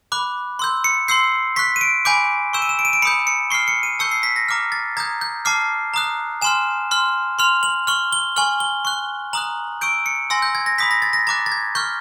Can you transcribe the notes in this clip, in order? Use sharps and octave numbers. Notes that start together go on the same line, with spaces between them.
B5 D6 F#6
C6 E6 G6
C#7
C6 E6 G6 C7
C#6 F#6 B6
D#7
D7
G#5 B5 D6 G6 D7
C#6 E6 G6 E7
D#7
E7
D7
D#7
D7
B5 D#6 G6 C#7
C#7
C#6 F6 C7
C#7
D#7
A5 C#6 E6 G6 C#7
C7
B6
A#6
A#5 D6 F6
A6
A#5 D#6 G6 G#6
G6
A5 D6 F6 C7
A#5 D#6 F#6
G#5 C6 F6 E7
C6 F6
C6 F6 F7
F#7
C#6 F6 F#7
G7
G#5 C#6 F6 F#7
G7
C#6 F#6
A#5 D#6 F#6 F#7
C#6 E6 G6 D7
C#7
G#5 C6 E6 A#6
G6
G#6
A#6
B5 D#6 G6 B6
A#6
A6
A#6
A#5 D6 F#6 A6
A6
G#6
C#6 F6 G6